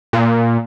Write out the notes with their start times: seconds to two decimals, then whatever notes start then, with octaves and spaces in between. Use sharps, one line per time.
0.13 A#2